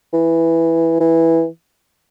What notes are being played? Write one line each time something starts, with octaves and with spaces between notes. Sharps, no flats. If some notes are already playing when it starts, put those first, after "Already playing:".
E3
E3